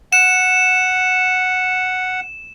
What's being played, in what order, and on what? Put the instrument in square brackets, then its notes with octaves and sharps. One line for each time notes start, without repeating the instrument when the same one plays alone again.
[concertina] F#5 [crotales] E7